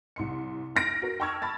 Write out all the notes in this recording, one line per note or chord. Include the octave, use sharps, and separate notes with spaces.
C2 C6 C#7
F6 A#6 D7
F#4 A#4
G5 A5 C#6 E6 F6 G#6
A5 B5 A6